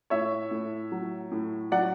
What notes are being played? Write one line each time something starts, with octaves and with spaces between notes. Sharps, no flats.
A2 C#5 E5
A2
F#3
A2
F#3 D5 F#5